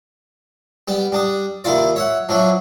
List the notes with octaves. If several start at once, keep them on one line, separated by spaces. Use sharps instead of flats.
G3 B3 G5
G3 D4 D#6
D#2 D#3 E4 F4 D5
C#5 E5 F#5
F3 F#3 D4 E4